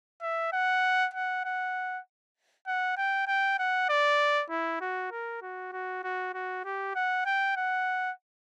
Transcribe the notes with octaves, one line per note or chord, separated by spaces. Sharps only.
E5
F#5
F#5
F#5
F#5
G5
G5
F#5
D5
E4
F#4
A#4
F#4
F#4
F#4
F#4
G4
F#5
G5
F#5